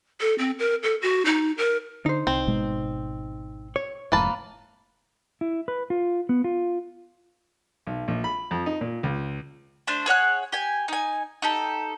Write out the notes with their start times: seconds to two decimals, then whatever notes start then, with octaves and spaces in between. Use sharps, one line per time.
0.21 A4
0.39 C4
0.59 A#4
0.83 A4
1.02 F#4
1.25 D#4
1.58 A#4
2.06 D3 D#4 C5
2.27 C2 C4
2.47 G#1 B2 G#3
3.76 C#5
4.12 F1 F2 G#2 A#3 B4 A5
5.41 E4
5.68 B4
5.90 F4
6.29 B3
6.44 F4
7.87 B1
8.08 A#1
8.24 B5
8.51 F2
8.66 D#4
8.81 A#2
9.03 C#2
9.87 A3 D4 C5
10.06 G#4 C#5 F#5 F#6
10.52 G4 G#5
10.88 D#4 G#5
11.42 D#4 G4 A4